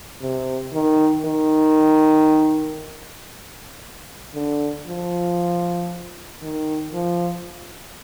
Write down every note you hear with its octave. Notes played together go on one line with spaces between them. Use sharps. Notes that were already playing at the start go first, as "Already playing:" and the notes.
C3
D#3
D#3
D3
F3
D#3
F3